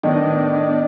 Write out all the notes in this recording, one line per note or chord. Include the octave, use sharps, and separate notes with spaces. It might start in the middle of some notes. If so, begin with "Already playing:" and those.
A2 D#3 B3 D4 D#5